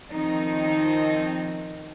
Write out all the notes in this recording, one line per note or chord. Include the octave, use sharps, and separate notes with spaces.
D#3 F3 C4 D#4